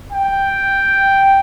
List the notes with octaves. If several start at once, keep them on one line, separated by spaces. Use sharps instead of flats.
G5